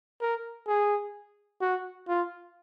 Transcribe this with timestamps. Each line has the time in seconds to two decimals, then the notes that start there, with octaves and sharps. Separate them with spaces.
0.21 A#4
0.68 G#4
1.61 F#4
2.08 F4